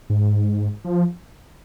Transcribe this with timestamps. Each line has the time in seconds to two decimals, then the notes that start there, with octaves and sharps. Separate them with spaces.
0.10 G#2
0.84 F3